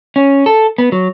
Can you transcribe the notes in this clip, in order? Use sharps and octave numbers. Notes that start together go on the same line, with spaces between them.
C#4
A4
B3
F#3